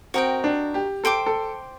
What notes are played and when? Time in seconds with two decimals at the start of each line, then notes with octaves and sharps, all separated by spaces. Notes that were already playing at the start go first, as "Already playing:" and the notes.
0.14 C4 F#4 A#4 D#5 G5
0.44 D4
0.74 G4
1.04 A4 C5 G5 D6
1.26 A4